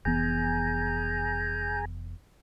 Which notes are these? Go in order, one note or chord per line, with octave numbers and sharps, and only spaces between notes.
F1 E3 B3 G#4 G#5 A#5 G6